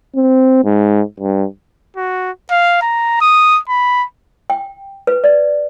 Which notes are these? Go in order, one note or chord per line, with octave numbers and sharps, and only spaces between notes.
C4
G#2
G2
F#4
F5
A#5
D#6
B5
G5
B4
D5